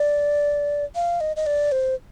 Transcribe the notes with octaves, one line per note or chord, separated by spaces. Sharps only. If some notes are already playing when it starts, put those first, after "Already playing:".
Already playing: D5
F5
D#5
D#5
D5
C5